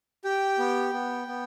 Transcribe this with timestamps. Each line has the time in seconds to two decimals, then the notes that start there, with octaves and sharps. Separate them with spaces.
0.24 G4 G5
0.59 B3
0.93 B3
1.28 B3